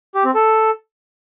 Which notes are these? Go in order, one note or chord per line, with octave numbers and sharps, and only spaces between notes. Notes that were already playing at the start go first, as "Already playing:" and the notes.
G4
C4
A4